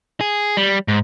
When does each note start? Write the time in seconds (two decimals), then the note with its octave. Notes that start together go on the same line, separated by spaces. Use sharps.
0.21 G#4
0.57 G3
0.88 G#2